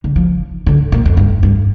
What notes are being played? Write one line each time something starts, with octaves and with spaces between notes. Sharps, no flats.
D3
F3
D3
A#2
F2
G2
G2